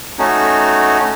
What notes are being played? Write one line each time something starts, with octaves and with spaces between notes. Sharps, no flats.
A3 C#4 D#4 F#4